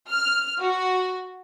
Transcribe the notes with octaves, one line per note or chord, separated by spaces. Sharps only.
F6
F#4